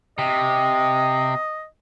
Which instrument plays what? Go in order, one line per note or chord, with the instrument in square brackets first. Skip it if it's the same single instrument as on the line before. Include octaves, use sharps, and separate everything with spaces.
[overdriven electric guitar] C3 [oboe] D#5